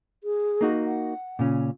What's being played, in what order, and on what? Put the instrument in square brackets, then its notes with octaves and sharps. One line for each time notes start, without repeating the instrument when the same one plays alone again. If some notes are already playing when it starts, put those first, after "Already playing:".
[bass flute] G#4
[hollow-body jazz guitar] A#3 D#4 F#4
[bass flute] F#5
[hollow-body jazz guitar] A#2 C#3 C#4